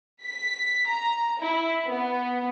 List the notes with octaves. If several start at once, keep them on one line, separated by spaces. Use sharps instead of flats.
B6
A#5
E4
B3